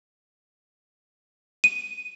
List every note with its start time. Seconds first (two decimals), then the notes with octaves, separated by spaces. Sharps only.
1.64 D#7